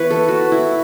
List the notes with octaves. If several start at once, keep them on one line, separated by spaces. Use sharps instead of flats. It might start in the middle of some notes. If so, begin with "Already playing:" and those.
Already playing: E3 B3 B4 C#5
A4
F#4
E4